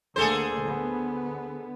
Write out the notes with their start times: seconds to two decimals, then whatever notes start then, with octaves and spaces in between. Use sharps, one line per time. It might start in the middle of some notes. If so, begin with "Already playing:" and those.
0.16 D2 D3 A#3 G#4 A4 C5
0.63 D3 B3